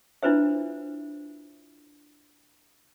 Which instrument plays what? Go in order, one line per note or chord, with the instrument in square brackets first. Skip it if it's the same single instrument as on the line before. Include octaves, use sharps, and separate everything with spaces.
[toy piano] D4 E4 F4 B4 C5 E5